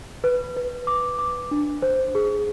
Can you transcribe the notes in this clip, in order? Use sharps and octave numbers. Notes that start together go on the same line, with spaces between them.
B4
B4
D6
D6
D4
C5
G#4